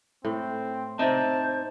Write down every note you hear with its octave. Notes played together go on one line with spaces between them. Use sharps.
A2 C4
C4 D#4 C5 D5 E5 A5 G6